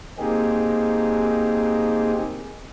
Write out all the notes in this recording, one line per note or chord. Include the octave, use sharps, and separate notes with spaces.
A#3 C4 D#4 G4 G#4